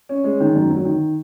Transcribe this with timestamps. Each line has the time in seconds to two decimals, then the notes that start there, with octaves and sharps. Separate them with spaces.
0.09 C#4
0.24 G#3
0.40 D#3
0.55 F#2
0.70 F#3
0.85 D#3